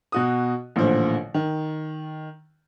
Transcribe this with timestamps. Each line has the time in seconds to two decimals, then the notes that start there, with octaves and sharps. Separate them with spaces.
0.12 B2 F#4 D#6
0.76 A1 A#2 D3 F3
1.34 D#3